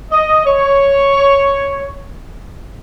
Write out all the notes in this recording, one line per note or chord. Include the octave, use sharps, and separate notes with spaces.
D#5
C#5